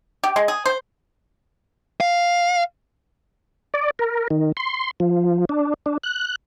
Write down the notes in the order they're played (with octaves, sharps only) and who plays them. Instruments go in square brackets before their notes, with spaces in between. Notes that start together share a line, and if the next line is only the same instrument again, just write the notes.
[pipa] G4
G#3
G#4
C5
[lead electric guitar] F5
[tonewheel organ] D5
A#4
D#3
C6
F3
D4
D4
F#6